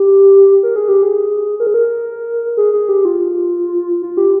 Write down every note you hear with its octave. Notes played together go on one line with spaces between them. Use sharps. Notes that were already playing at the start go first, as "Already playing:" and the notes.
Already playing: G4
A#4
G#4
G4
G#4
A#4
G#4
A#4
G#4
G#4
G4
F4
F4
G4